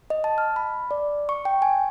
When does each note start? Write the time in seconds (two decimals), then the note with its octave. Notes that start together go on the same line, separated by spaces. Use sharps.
0.10 D#5
0.24 A5
0.38 F6
0.56 B5
0.91 D5
1.29 C#6
1.45 G5
1.62 G#5